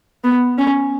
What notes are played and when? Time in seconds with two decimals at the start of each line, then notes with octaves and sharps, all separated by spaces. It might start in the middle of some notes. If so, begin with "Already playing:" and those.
0.24 B3
0.58 C#4